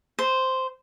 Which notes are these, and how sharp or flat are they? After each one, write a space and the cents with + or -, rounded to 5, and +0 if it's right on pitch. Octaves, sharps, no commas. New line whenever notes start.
C5 -5